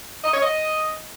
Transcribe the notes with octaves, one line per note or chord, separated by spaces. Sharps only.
D#5
C#5
D#5